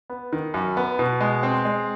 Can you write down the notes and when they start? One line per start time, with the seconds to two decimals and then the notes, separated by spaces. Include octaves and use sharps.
0.10 B3
0.33 D#3
0.54 F#2
0.77 B3
0.99 B2
1.20 G#3
1.43 C4
1.65 G#3